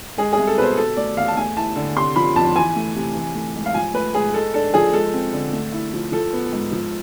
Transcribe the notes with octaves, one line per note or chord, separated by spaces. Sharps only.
G#3 G#4
C2 G#4
A4
B2 B4 C5
B2 A4
A3 D5
E2 F5
A5
A3 G#5
E4 A5
D3
C3 C6
F3 B5
F2 A5
E3 G#5
A3
C3
E3
A3
G#2
F5
F3 G#5
A3 B4
G#2 G#4
G#3 A4
D4 A4
F3 G#4
G#3 A4
C4
D3
A3
E4
F3
F3 A4
B3
G#2
F3